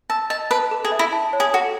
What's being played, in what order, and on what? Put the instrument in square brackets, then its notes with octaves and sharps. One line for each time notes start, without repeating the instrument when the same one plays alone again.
[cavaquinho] A5 [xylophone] E6
[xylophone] D#5 [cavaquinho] A5
[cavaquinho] B4 [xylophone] A5
[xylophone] A4
[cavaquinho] G#4
[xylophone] E5
[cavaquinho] E4
[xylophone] A5
C#5
[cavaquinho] G#4
[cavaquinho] F#4 [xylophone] A4